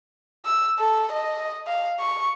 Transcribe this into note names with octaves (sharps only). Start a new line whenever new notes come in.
E6
A4
D#5
F5
C#6